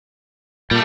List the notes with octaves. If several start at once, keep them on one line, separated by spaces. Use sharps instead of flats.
A#2 G3 A3